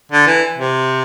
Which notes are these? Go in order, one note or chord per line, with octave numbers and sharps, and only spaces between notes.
D3
E3
C3